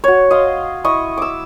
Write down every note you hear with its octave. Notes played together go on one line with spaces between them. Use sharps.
F#4 C#5
D#5 F5 C6
E4 D#5 C#6
D6 E6